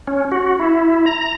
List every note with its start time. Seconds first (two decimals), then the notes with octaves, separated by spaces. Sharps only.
0.07 C#4
0.32 F#4
0.60 E4
1.06 A#5